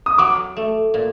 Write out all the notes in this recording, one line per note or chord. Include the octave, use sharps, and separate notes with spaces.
D#6
F#3 D6
A3
A#2